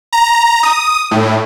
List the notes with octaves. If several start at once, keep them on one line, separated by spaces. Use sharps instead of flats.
A#5
D#6
A2